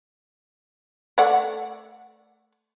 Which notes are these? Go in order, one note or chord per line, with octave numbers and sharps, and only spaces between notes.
A3 D5 F#5